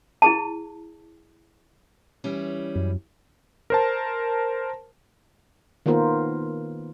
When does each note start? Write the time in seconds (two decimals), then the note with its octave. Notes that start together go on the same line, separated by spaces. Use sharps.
0.22 E4 G#4 A5
2.24 E3 G3 C#4
2.76 F#2
3.70 A#4 C5 A5
5.86 D#3 A#3 B3 F4 A#4 C5